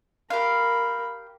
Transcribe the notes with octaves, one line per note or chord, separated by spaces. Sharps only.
G4 A#4 F5 B5